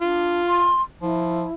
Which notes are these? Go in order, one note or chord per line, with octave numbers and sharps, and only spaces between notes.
D4 F4
C6
F3 E4